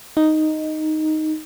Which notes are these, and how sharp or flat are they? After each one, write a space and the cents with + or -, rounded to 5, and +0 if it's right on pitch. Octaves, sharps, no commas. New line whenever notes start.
D#4 +0